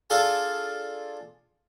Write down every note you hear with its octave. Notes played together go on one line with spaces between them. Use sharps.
D4 F4 G#4 A4 F5 G#5